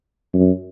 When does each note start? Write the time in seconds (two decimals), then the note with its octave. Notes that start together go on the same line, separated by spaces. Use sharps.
0.34 F#2